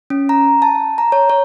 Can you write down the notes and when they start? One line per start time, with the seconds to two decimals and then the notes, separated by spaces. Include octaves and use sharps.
0.10 C#4
0.29 A#5
0.62 A5
0.98 A#5
1.12 C#5
1.30 C#5